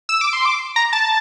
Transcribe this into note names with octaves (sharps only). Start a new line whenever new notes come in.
E6
D6
C6
D6
A#5
A5